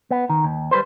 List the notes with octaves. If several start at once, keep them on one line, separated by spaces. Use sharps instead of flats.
B3
D#3
D#2
G3 G#4 B4 C5